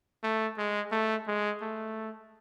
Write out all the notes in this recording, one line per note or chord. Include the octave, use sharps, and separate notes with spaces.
A3
G#3
A3
G#3
A3